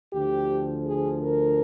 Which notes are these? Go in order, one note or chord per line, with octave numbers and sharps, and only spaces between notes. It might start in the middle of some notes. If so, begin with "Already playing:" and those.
D2 D3 F3 G4
G#4
A#4